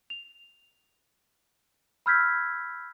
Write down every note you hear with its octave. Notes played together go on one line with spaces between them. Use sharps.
F7
B5 E6 F6 G6 G#6 B6